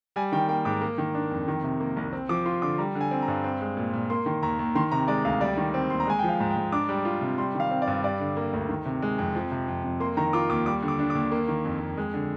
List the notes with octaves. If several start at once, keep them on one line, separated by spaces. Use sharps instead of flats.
G3 G#5
D#3 G5
A#3 G5
G#2 D6
A#3
D#3
D4
F2
D#3
C3
A#3
C2
C4
F3 D6
F4 C6
D3 D6
G3 A#5
D3
G#5
C4
A#5
G2
C4
G#3
A#2
A#2
A#3 C6
D#3
D#2 A#5
D#2
D#3 C6
C3 A#5
G#3 D5
D2 F5
G3 D5
D#3
C4
D#2 C6
A#5
G#3 G#5
F3 G5
F5
G#2
G5
G#2
D4 D6
G3
F4
C3
G3 C6
D#3
F5
C4
D5
G2
G3 D5
D3
A#3
D2
D#3
C3
G#3
F2
F3
C3
F2
F2
A#3 C6
D#3 A#5
F4 D6
D#2 D6
G3 D6
D3
D6
D4
D#2 D6
A#3
D#3
F2
F2
G#3
D3